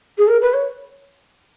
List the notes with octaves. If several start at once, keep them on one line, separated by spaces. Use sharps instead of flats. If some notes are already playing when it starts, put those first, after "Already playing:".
G#4
A#4
B4
C#5